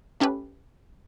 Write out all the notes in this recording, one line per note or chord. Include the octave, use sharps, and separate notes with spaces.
A3 C#4 G4 A4 B4